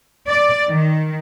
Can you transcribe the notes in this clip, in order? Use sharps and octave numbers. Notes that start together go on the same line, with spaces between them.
D5
D#3